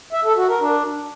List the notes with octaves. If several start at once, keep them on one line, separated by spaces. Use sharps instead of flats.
E5
A4
F#4
A#4
D4